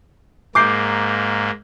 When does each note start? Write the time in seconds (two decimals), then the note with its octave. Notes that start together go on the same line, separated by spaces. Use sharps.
0.55 G#2 A#3 D6 G6 C7